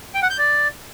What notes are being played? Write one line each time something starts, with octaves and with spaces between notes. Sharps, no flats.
G5
F#5
G6
D5